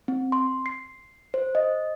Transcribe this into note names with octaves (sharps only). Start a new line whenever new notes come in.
C4
C6
C7
C5
D#5